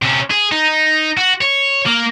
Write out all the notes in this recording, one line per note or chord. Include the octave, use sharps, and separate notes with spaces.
C3 C#4
G#4
D#4
F#4
C#5
A#3